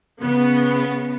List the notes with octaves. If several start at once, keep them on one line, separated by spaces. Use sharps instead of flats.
C#3 B3